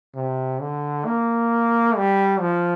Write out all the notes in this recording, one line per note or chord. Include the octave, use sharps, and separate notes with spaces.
C3
D3
A#3
G3
F3